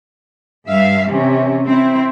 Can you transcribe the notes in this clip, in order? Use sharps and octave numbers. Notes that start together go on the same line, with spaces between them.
G2 E5 F5
C3 E3 C#4
C4 E4